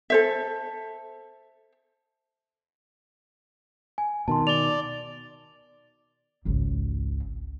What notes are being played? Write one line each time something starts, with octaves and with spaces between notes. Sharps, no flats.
A4 C5 E5
G#5
B2 D#3 A5 C6
D5 F7 G7
G#1 C#2